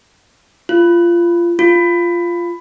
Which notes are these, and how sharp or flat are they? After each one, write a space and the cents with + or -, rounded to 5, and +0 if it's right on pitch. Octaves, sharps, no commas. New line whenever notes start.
F4 -20
F4 -10